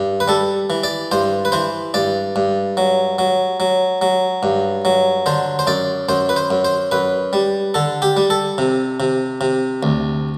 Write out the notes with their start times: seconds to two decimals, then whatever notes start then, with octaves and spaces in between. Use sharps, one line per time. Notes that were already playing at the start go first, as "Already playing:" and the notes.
Already playing: G2
0.20 B4
0.28 G3 A4
0.70 E3
0.84 D5
1.11 G2 C5
1.45 B4
1.52 E3 C5
1.94 G2 D5
2.36 G2
2.77 F#3
3.19 F#3
3.60 F#3
4.02 F#3
4.43 G2
4.85 F#3
5.26 D3 C5
5.59 C5
5.67 F#2 D5
6.09 F#2 C5
6.29 B4
6.36 C5
6.51 F#2
6.65 C5
6.91 F#2 B4
7.33 G3
7.74 D3 A4
8.02 G4
8.17 G3
8.30 A4
8.58 C3
9.00 C3
9.41 C3
9.83 D2